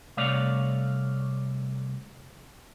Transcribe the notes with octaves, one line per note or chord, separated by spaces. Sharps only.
C2 C3 A3 C#5 D5 F5